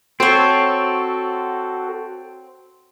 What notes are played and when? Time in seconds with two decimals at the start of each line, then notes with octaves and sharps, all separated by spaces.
0.20 C4 F#4 A4 C5 C#5